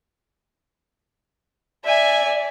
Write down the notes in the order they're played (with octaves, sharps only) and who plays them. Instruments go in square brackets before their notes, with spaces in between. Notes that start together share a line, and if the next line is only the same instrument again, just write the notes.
[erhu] D5 [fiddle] E5 G#5